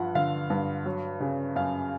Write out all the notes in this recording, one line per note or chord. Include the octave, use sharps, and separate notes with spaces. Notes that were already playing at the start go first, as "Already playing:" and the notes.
Already playing: G2 F3 F#5
D3 F5
G2
F#3
C#3
F#2 F5